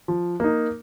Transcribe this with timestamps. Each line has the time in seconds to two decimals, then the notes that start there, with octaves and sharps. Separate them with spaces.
0.08 F3
0.40 A#3 D#4